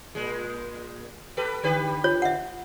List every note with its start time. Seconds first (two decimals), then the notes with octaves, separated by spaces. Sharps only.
0.15 A#2 G#3
1.37 G4 A4 B4
1.63 D3 G4 B4
2.04 F4 C#5
2.22 E5 F#5